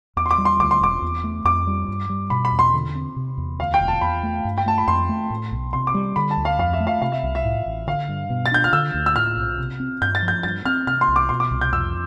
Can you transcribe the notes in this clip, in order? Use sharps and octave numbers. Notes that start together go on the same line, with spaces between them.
E2 D6
C6
D6
G3
C6
D2 D6
C6
E1 D6
E2
A3
F2 D6
G3
G2
G3
B2 B5
B5
E2
C6
D3
C4
C3
E2
D2 F5
G5
E1
A5
E2 B5
A3
G2
G5
A3 A5
B5
F2 C6
A3
A2
B1
C3 C6
D6
G3
D3 B5
A5
D2
F5
F2 F5
E5
A3
F5
C3 F5
E5
C2
E5
A2
A1
D3 F5
G2
B2
A6
D4 G6
F6
D3 E6
D2
E6
A2 F6
B1
C3
C4
G2 G6
A6
F3
G6
G2 A6
C4 F6
C3 F6
C6
C2
D6
B2 C6
D6
C2
G6
F2 E6